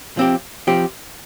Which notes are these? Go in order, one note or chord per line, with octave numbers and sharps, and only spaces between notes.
F3 C4 G4
F3 C4 G4